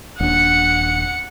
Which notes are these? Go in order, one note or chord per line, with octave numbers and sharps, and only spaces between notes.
D#1 D4 F#5 C#7